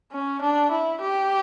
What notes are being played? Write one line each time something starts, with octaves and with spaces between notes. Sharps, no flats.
C#4
D4
E4
G4